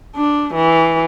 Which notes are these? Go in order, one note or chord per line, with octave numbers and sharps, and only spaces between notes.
D4
E3